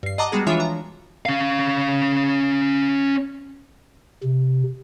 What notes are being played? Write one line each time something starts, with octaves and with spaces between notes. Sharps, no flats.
G2 C7
D#5 F#5 A5 A#5 D6 D#6
G3 G#3 B3 F#4 G#4
E3 F3 D4 F4 C#5 E5
A#5
C#4 F5
C3